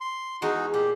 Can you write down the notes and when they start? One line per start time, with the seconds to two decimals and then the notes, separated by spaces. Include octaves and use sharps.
0.01 C6
0.42 E2 G#3 D#4 F#4 F5
0.74 A#2 G4